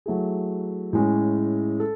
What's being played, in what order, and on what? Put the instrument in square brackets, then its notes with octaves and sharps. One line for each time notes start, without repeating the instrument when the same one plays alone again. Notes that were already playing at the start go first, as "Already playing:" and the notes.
[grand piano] F#3 A3 E4 G#4
A2 G#3 C#4
A4